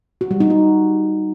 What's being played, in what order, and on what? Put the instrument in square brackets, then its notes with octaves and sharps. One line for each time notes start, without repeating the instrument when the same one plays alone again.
[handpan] F#4
G3
D#4
F#4